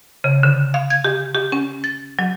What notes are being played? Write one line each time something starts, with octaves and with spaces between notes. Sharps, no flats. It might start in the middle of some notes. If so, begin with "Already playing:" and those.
C#3
D3
F5
G#6
G4
G4
C#4
A6
F#3